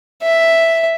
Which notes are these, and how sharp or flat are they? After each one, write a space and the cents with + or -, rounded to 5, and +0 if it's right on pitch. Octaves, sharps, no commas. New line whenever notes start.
E5 +0